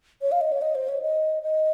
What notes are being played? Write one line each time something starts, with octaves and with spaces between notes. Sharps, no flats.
C#5
F5
D#5
C#5
D#5
C5
C#5
D#5
D#5